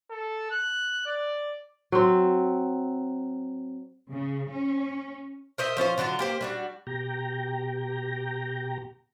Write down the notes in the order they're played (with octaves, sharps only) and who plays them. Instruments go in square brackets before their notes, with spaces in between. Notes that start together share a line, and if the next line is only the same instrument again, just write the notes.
[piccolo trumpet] A4
F#6
D5
[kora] F#3 C4
[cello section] C#3
C#4
[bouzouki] A#4 C5 D#5 E5
F3 C#4 F4 C5
D3 F#3 E4 F4
A#3 G4 C5
G3 D4 F#4
[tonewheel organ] B2 G4 G5 A#5